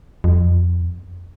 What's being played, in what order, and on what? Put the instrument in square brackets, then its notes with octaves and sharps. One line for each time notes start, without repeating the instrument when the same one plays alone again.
[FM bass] F2